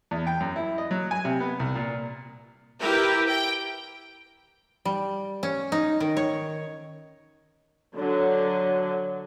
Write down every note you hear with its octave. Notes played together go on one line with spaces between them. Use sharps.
E2
G5
F#2
E4
D#5
F#3
G#5
C3
B3
C2
A#2
E4 G4 A#4 B4
G5
G3
C#4
D#4
D#3
C#5
D3 F#3